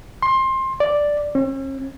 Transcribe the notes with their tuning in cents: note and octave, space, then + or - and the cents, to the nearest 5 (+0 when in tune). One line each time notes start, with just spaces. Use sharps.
C6 +20
D5 +0
C#4 -45